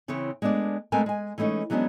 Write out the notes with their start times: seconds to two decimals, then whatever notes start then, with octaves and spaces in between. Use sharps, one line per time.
0.08 C#3 E3 C4 E4 C#5
0.42 G#3 A3 B3 D4 D5
0.92 G#3 A3 C4 A#4 B4 G#5
1.06 G#3 G#5
1.38 E3 G#3 A3 C#4 D#4
1.70 E3 F#3 G#3 B3 C#4 D4